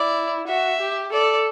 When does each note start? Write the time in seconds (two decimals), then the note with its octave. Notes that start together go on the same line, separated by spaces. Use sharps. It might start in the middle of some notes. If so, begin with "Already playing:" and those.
Already playing: E4 D5
0.47 F#4 E5
0.80 G4
1.13 A4 D5